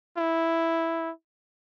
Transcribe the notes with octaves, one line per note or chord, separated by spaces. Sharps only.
E4